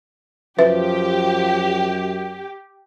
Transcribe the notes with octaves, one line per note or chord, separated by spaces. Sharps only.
F#2 F3 G4 B4 E5